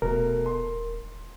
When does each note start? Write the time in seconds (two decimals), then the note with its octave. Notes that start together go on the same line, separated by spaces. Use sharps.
0.02 D#1 B2 A3 A#4
0.46 C6